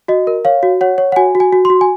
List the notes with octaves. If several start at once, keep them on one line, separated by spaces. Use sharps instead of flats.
F#4 D#5
A#4
C#5 F5
F#4
C#5 F#5
C#5
F#5
F#4 G#5
F#4
G#5
F#4
F#4 C6
G#5